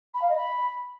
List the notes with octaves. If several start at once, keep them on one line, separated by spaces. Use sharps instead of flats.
B5
F5
D#5
B5